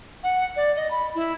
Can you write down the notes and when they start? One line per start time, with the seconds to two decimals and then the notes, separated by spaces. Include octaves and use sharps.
0.23 F#5
0.56 D5
0.76 D#5
0.91 B5
1.15 E4